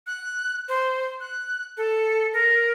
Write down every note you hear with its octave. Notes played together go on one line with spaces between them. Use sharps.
F#6
C5
F#6
A4
A#4